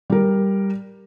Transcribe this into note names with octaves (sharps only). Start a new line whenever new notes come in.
G3 A#4